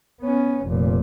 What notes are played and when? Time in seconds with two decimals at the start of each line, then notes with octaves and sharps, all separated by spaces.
0.21 B3 C#4
0.67 F1 A#2